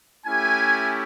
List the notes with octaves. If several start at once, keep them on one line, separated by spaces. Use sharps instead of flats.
A3 C#4 E4 G4 G#5